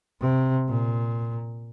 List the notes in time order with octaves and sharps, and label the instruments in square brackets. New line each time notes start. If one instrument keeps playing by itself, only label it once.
[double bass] C3
A#2